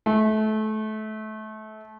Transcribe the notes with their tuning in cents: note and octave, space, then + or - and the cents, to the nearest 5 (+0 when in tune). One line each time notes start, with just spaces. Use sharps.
A3 -25